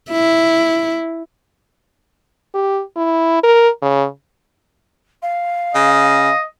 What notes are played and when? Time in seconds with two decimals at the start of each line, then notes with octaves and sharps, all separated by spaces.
0.11 E4
2.54 G4
2.96 E4
3.43 A#4
3.82 C#3
5.23 F5
5.75 C#3 D#5